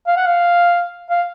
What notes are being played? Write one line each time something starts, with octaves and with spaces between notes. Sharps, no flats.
F5
F#5
F5
F5